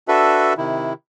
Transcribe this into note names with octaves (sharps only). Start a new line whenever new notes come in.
D4 F#4 A4 B4 E5
C3 D#3 E4